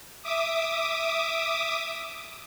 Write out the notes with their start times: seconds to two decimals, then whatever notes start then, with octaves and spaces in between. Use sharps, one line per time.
0.22 E5 D6 D#6